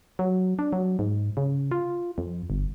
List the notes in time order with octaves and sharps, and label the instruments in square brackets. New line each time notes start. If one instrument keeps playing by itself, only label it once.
[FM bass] F#3
D4
F#3
G#2
C#3
F4
F2
G1